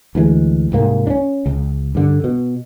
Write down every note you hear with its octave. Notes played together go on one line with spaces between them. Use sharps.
D2 E3 G3 G#3
C2 G#2 A#3
C#4 D4
C#2
G2 D3
B2